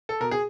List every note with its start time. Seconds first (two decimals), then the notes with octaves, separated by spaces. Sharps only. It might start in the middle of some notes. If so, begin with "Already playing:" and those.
0.09 A4
0.20 B2 A#4
0.31 G#4